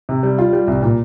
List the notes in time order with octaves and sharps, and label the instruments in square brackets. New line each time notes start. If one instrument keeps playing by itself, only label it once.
[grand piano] C3
G3
F4
G3
C2
A#2